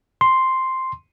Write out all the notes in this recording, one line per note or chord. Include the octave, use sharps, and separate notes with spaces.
C6